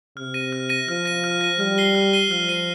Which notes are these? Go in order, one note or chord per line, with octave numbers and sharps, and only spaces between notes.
C3 F6
A#6 D#7
F6
A#6 D#7
F3 F6
A#6 D#7
F6
A#6 D#7
G3 F6
C7 D#7 G7
F6
C7 D#7 G7
F3 F6
C7 D#7 G7